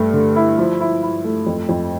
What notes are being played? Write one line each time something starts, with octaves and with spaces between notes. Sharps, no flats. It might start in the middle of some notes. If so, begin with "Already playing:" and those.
Already playing: G2 A3
D3
E4
F3
E4
E4
A3
F2
F2